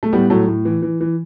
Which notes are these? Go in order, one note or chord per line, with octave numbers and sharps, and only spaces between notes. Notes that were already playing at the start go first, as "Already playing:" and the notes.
A3
A2 G3 B3
A2 F#3 A3
A2
E3
E3
E3